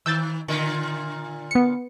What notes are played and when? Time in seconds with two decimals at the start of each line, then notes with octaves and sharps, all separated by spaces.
0.06 D#3 E6 G6 A6
0.48 A#2 D3 F4
1.51 B3 C#7